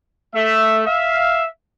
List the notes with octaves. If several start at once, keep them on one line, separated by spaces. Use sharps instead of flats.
A3 E5
E5 F5